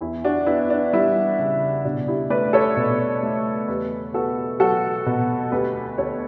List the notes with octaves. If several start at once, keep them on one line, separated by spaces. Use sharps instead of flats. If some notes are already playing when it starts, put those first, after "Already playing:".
E2 E4
D4 F#4
B3 E4
D4
G3 E4
C#3
B2 D4 F#4
E4 G4
A3 B4 D5
A4 C#5
B2
A3
E2 G4 B4
B3 F#4 A4
F#3 F#4 A4
B2
D2 G4 B4
D2 A4 C#5